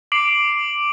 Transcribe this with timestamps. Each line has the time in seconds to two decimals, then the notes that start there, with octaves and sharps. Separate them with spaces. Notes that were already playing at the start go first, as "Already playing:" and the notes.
0.12 D6 C7 D7 F#7